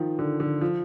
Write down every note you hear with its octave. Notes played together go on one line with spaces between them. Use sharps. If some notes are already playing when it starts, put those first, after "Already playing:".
Already playing: D#3 F3
D3
D3
F3